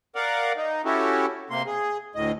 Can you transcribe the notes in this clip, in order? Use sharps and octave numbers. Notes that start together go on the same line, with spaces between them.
A#4 D5 F5 F#5
D#4
C#4 E4 F#4 G4 A4
C3 A#3 C6
G#4
D2 A2 D#5